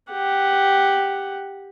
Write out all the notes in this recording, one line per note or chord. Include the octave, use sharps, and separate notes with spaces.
G4 F#5